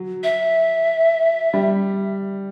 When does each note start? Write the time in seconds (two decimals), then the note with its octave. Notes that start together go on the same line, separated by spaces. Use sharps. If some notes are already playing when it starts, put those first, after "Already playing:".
Already playing: F#3
0.23 E5
1.54 G3